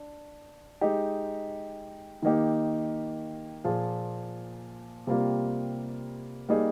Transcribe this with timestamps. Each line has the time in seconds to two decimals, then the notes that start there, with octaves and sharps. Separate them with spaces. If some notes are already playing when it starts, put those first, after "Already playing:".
Already playing: D4
0.81 G#3 D#4 G4
2.22 D#3 A#3 D#4 G4
3.64 A#2 F3 A#3 F4 G#4
5.07 C3 G3 A#3 F4
6.49 G3 A#3 D#4 G#4